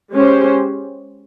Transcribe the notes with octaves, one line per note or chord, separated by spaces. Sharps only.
G#3 C#4 G4 C5